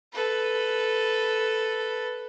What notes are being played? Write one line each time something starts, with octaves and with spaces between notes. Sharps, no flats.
A4 B4